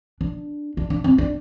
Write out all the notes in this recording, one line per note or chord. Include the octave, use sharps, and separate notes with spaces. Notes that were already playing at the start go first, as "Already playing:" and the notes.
D4
D4
D4
C4
D4